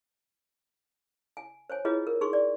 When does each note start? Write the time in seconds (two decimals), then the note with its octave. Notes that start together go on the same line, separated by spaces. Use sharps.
1.37 G#5
1.70 C5 C#5 G#5
1.85 E4 F4 G#4 B4 C#5 D#5
2.07 A#4
2.21 D#4 G#4 C6 C#6
2.33 D5